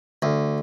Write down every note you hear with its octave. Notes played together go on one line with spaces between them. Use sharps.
D2